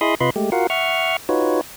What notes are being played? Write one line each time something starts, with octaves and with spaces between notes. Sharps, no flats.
E4 G#4 D#5 B5 C6 D#6
C3 F4 B4 D#5 B5 C6
G#3 A3 G4
F4 F#4 A#4 F5 F#5
E5 F#5 C#6 F6
D#4 F4 F#4 B4 C#5